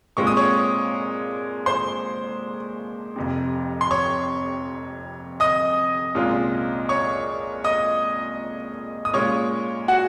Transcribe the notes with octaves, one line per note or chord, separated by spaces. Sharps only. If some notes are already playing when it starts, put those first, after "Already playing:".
A#2 G#3 C4 F4 C#6
D#6
C#5 C#6
C5 C6
F1 F2 C3
C6
C#5 C#6
D#5 D#6
C2 A#2 G#3 C#4 F4
C#5 C#6
D#5 D#6
D#6
A#2 G#3 C#4 F4 C#5 C#6
F#4 F#5